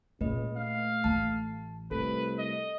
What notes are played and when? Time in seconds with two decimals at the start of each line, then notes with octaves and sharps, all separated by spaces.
0.21 C#2 A#2 C#4 B4 D#5
0.57 A3 F5
1.04 A1 E3 A5
1.91 C2 A3 A4 B4
2.38 D#5